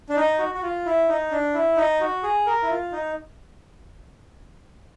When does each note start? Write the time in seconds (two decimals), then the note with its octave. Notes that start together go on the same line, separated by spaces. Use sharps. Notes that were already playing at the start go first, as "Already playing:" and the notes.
0.09 D4
0.16 D#4
0.39 F#4
0.55 F#4
0.63 F4
0.86 E4
1.08 D#4
1.31 D4
1.54 E4
1.77 D#4
2.01 F#4
2.23 G#4
2.46 A#4
2.63 E4
2.70 F4
2.92 D#4